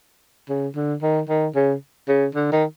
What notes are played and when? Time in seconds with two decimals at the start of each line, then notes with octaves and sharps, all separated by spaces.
0.49 C#3
0.76 D3
1.02 D#3
1.29 D#3
1.55 C#3
2.08 C#3
2.35 D3
2.52 D#3